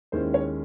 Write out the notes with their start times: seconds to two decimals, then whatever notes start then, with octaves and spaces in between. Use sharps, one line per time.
0.12 D#2 D#3 G#3 C#4 E4 C5
0.34 C#5